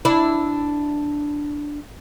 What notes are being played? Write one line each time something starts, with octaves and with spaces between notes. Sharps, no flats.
D4 E4